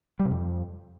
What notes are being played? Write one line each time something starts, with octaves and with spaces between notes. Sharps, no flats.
G3
C3
F2